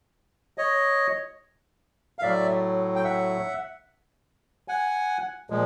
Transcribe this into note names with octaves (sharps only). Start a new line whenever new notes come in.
C#5 D#5
F5
A2 F#3 D5 E5
G5
E5 F#5
F#5 G#5
A#2 F3 G#3